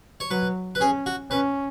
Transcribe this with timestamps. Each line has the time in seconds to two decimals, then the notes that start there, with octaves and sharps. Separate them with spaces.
0.20 C#5
0.31 F#3 B4
0.75 B4
0.81 C#4 G#4
1.06 F#4
1.31 C#4 B4